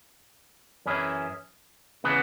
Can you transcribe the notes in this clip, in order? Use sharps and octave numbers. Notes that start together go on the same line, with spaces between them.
F#2 E3 C#4 E4 G#4
C#3 E3 B3